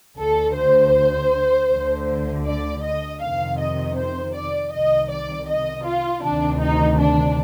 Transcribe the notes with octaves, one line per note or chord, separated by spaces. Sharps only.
D2 D3 A4
C5
D2 D3
D5
D#5
F2 C3 D#3 F5
D#5
C5
D5
C2 C3 D#3 D#5
D5
D#5
F4
D2 C3 D#3 D4
D#4
D4